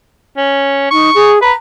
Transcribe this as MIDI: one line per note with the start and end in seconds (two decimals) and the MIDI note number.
0.37 0.87 61
0.91 1.10 63
0.91 1.32 85
1.14 1.39 68
1.42 1.52 71
1.42 1.53 82